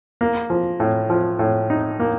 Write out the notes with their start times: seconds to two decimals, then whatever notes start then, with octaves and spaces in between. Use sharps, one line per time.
0.21 A#3
0.50 F3
0.80 A2
1.10 F3
1.39 A2
1.70 D#4
2.00 A#3